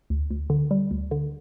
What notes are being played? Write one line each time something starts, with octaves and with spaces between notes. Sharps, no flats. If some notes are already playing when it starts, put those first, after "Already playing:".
D2
D2
D3
G3
D2
D3